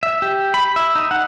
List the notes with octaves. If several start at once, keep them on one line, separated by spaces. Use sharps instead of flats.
E5
G4
B5
E5
D#4
F#5